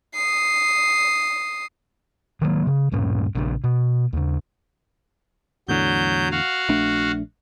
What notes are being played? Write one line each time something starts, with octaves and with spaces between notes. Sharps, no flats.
D#6 C7
D#3 F#3 G3 A#3
C#3
D1 G2 A#2 C#4
A#1 C#3 C4 D4
B2
D#2 C#3
E2 A2 D3 F#3 G6
F#4 F5
A#1 A3 D4